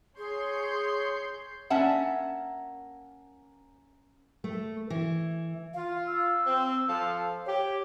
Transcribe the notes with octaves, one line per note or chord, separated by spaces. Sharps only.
G#4 C#5 C6 G6
A#3 C#4 E5 F#5 A5
A3
E3
F4 F5
E6
C4
F3 A4 F5
G4 C#5